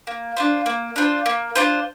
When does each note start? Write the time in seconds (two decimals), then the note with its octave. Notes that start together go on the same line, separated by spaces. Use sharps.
0.07 A#3
0.37 D4 F4 C5
0.66 A#3
0.96 D4 F4 C5
1.26 A#3
1.55 D4 F4 C5